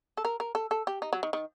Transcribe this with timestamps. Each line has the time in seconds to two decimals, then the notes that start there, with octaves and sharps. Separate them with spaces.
0.17 A4
0.25 A#4
0.40 A#4
0.55 A4
0.71 A4
0.87 G4
1.02 D#4
1.13 F#3
1.23 D#3
1.33 D#3